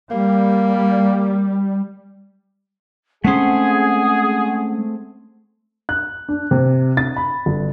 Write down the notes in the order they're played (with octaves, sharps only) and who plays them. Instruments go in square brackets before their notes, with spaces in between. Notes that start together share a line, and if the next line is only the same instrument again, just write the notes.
[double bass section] G3 [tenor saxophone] A#3
[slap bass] G#3 C#4 [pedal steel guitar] A3 C4 C6 [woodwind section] G#4 [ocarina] F#5
[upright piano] F#6
D4
C3
A6
B5
G1